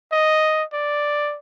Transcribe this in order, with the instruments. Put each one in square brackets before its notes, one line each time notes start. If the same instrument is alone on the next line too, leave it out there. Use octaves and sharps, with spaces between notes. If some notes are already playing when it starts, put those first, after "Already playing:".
[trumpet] D#5
D5